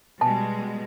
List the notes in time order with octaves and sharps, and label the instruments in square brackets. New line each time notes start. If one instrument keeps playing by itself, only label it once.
[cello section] B2 G3 G#3 [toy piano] G#5 A5